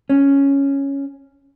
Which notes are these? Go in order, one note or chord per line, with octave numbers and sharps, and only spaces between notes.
C#4